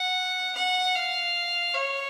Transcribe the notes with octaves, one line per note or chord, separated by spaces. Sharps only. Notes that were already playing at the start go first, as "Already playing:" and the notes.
Already playing: F#5
F#5
F5
C#5